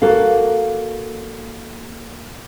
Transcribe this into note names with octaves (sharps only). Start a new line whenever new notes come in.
A#3 F#4 A4 F5